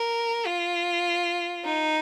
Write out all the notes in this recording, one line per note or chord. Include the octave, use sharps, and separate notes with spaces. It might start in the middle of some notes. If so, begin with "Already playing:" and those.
Already playing: A#4
F4
D#4